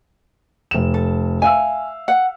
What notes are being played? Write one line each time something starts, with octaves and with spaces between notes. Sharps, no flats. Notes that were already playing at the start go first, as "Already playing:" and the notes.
F1 E7
A4
E5 F5 G#5 E6
F#5